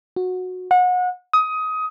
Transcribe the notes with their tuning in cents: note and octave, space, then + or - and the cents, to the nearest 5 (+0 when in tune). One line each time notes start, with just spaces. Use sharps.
F#4 -15
F#5 -30
D#6 +20